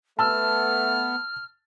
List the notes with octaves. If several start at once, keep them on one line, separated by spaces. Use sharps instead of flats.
A3 B3 A5 E6 F6